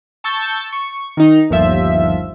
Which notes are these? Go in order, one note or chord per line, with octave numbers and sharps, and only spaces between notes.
A5 C#6 E6 G6 A6
C#6
D#3 D#4
G1 D#2 F3 E5